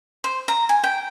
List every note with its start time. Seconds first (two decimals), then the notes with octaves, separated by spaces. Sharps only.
0.24 C5
0.48 A#5
0.69 G#5
0.84 G5